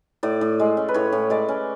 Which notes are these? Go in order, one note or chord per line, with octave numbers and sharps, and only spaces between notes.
A2 D5
A2
G#3
C#4
B4
A2 C#5
A2
G#3 D5
C#4